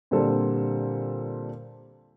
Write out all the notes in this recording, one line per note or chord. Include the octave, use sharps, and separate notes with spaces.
A#2 D3 G3 C4 A4 A#4